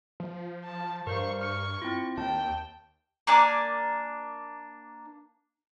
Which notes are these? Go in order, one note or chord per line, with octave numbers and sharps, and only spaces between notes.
F3
A5
G2 A#4 C5 F5 C#6
C#6 F6 C#7
C4 E4 F4
D#2 G5 A5
A#3 D4 G#5 D6